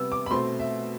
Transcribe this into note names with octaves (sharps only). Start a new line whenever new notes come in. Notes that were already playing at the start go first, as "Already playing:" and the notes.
Already playing: C3 G3 B3 E6
D6
B5
B2 A3 C4 C6
E5